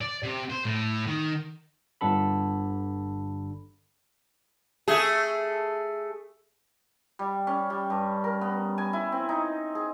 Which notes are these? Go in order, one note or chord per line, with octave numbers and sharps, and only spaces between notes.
D5
C3
C5
A2
D#3
G1 G2 D3 A4 B5
A3 G#4
G3
C#4
G3
G2
A#4
B3
G#5
E4
C4
D#4
G#4